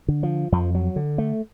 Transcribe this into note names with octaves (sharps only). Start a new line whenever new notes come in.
D3
F3
F2 F3
F#3
D3
A3